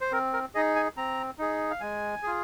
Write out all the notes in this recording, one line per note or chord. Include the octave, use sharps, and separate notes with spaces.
C5
C4 A#4
A#4
D#4 G#4 D#5
G#5
C4 A#5
D#4 G#4
F5
G#3 G#5
F4 G#4